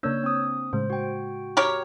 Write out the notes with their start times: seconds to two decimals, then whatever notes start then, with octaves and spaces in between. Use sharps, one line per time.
0.03 C#3 A#3 D4 C#5 E6 G6
0.24 C4 D#6
0.73 A2 C#3 G#3 C5
0.90 F#4 G5
1.57 G4 A#4 C#5